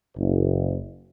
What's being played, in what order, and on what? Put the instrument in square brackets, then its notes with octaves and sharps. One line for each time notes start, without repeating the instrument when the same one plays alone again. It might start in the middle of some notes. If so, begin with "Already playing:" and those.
[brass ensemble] F#1